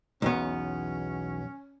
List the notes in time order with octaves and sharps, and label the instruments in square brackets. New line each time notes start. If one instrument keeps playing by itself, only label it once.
[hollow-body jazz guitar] B1 E2 B3 [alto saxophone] C#4